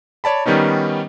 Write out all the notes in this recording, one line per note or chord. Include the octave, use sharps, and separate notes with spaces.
C#5 D5 A5 B5
D#3 G3 B3 C#4 D#4